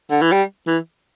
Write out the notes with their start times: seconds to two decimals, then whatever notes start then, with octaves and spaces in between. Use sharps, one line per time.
0.10 D3
0.21 E3
0.32 G3
0.67 E3